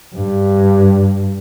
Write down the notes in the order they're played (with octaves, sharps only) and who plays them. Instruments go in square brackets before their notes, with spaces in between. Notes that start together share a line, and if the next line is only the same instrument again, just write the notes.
[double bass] G2